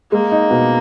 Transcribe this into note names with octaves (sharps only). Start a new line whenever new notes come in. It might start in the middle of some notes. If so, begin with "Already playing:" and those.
G#3 A#3
D#4
B2